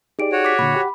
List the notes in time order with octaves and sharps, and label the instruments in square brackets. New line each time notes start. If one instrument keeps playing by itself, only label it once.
[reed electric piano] D#4 G4 D5 [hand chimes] G#4 D7
[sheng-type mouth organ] F#4 C#5
[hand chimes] D6 B6
[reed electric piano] A#2 D3 [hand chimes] B5
[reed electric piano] G4 F#5